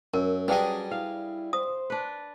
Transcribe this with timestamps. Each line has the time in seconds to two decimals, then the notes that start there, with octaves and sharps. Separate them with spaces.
0.14 F#2 A#4
0.48 F#3 G3 C#4 D4 G#4 B4 D#5 G5
0.91 E4 F5
1.53 C5 D#6
1.90 D4 B4